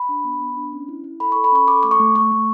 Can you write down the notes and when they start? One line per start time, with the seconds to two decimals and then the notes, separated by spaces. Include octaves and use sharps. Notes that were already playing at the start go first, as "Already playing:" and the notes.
Already playing: B5
0.09 D4
0.25 B3
0.40 B3
0.57 D4
0.73 C#4
0.88 E4
1.04 E4
1.20 A4 B5
1.32 C#6
1.36 A4
1.44 B5
1.52 C#4 C#6
1.68 A4 D6
1.83 A3 D6
1.91 C#6
1.99 A3
2.15 A3 C#6
2.32 A3